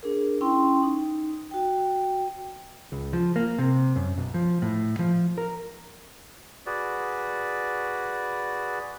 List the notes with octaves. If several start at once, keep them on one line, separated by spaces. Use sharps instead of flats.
D4 G#4 A#4
C#4 E4 G5 C6
D#4
F#4 G5
C#2
F3
A#3
C3
F#2
B1
F3
A2
F3
A#4
F#4 G#4 B4 D5